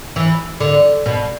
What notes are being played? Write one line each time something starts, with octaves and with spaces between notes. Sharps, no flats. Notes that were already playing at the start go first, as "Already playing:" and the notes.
E3
D3
B2